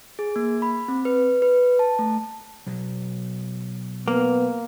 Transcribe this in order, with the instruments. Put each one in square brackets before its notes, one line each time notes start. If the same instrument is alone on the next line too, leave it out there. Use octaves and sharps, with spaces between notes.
[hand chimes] G#4
A#3
B5
C4
B4
B4
A5
A3
[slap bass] B2 F#3
[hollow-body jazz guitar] A#3 [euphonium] B3